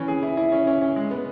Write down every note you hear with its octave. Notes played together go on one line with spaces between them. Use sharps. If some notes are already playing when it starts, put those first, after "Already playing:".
Already playing: E3 C#4
G#4
E4
E4
C#4
C#4
C#4
G#3
B3